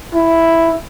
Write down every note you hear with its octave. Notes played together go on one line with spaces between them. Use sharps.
E4